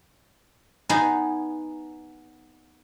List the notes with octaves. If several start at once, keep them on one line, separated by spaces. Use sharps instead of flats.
B3 D#4 G#4